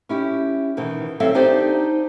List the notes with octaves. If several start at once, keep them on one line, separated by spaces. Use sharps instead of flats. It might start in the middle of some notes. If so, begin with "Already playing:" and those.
C#4 E4 G4
B2 D#3 E3
F#3 G3 C4 A4 E5 F5
D4 D#4 G4 C5 D5